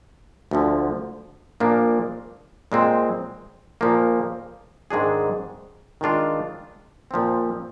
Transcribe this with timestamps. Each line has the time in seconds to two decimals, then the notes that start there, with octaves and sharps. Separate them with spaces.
0.51 D2 D3 F3
1.60 A#2 F3 A#3 D4
2.72 A#2 G#3 C4
3.81 A#2 F3 A#3
4.90 G#2 D#3 G#3 D4 G#4
6.01 D#3 G#3 D4 F4
7.11 A#2 F3 C4